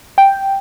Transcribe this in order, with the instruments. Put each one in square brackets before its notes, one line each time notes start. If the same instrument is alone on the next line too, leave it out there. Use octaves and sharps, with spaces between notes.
[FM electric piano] G5